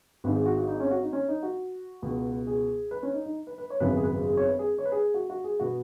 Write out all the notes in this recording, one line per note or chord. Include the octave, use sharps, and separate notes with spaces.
G#1 G#2 G#3 B4
G#4
F#4
F#4
D#4
C#4
F#4
D#4
C#4
D#4
F#4
C#2 B2 B3
G#4
B4
C#4
D#4
D#4
B4
B4
C#5
G#1 F#2 C#3 B3 B4
G#4
B4
G#4
C#5
B4
G#4
C#5
B4
G#4
F#4
F#4
G#4
B2 B3 F#4